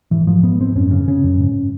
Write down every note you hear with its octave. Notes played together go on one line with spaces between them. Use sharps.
G#2 E3
G#2 F3
G#2 B3
G#2 C4
F#2 C#4
C#3 C#4
C#3 C#4
F#2
G#2